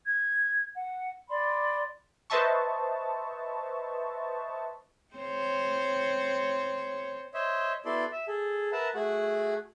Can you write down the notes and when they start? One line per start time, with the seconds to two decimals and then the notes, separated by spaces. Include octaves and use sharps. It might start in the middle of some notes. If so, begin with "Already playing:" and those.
0.06 G#6
0.75 F#5
1.29 D5 B5 C6
2.30 B4 C5 D#5 E5 A5 C#6
5.14 C4 C5 C#5
7.34 C5 C#5 D#5 E5
7.85 B3 E4 F#4 A4 D5 C6
8.12 E5
8.27 G#4 A4
8.72 A#4 B4 E5 F#5 A5
8.95 A3 F#4 G#4 F#5